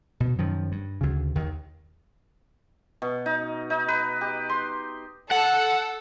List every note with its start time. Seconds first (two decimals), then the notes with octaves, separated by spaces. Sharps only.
0.20 B2
0.38 F#2 D#3 F3
0.72 G2
1.01 D2 C#3
1.35 D#2 D#3
3.02 B2
3.26 D#4
3.70 D#4
3.88 B4
4.21 G4
4.49 C6
5.31 A4 F#5